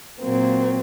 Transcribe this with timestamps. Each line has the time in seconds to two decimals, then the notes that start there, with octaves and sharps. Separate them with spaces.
0.22 A#2 F#3 A#3 C4